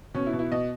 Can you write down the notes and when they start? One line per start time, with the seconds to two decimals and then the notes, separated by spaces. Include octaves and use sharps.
0.14 B2 C#4
0.26 E4
0.33 B2
0.39 E4
0.52 B2 D#5